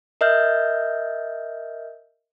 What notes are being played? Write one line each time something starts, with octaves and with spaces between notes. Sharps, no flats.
A#4 D#5 E5 F6 G6